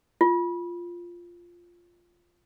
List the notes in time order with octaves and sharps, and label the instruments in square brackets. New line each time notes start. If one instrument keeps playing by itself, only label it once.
[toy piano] F4